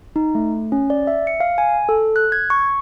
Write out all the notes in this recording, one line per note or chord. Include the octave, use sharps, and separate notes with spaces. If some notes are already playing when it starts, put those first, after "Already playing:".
D#4
A3
C#4
D5
E5
C#7
F5
G#5
A4
F#6
G#6
C#6